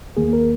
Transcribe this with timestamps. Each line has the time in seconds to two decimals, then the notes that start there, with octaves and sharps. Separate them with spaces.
0.17 D#2 D#3 A#3 G#4
0.33 A#4